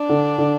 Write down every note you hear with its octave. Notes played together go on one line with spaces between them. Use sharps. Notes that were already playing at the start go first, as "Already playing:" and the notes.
Already playing: D4
D3
D3